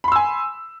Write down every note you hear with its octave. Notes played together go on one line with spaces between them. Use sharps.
G#5 B5 C6 E6